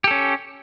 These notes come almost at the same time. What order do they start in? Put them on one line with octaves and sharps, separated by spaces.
G4 A4 C#4